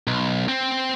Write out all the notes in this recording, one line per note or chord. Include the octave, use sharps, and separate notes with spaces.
B1
C4